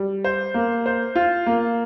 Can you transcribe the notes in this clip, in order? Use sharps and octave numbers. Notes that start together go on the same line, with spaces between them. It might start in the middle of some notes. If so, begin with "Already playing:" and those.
Already playing: G3
C5
A#3
C5
F4
A#3